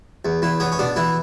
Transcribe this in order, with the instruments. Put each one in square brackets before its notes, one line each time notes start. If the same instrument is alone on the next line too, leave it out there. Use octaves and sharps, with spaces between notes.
[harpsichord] E2
E2 E4
B3 C#4
C#4
B2 D4
E3 E4